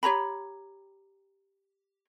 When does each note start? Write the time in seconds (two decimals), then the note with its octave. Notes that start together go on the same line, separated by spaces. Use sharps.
0.03 G4 C#5 A#5 B5